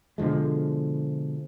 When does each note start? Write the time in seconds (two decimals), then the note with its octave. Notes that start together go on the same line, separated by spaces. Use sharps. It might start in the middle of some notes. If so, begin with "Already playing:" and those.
0.18 B2 D3 F3 G#3